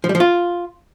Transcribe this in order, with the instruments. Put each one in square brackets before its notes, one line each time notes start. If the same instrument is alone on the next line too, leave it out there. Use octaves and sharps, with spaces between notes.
[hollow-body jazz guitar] F3
G3
F3
F4